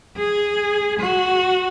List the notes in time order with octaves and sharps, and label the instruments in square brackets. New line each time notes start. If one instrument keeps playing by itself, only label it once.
[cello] G#4
F#4